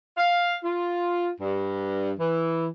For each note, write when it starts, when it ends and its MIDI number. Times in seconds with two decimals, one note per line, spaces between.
0.17 0.57 77
0.63 1.28 65
1.40 2.11 43
2.18 2.66 52